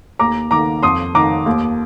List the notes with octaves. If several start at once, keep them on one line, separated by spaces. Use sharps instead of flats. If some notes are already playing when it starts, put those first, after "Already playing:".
D#2 A#5 D6
D#3 A#5 D6
F2 C6 D#6
D#3 A#5 D6
D#2